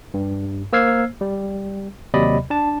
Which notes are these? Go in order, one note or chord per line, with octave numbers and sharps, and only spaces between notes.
G2
A#3 C5 E6 F6 G#6 C7
G3
D#2 C3 F#3 D5 D#5 B5
D4 A5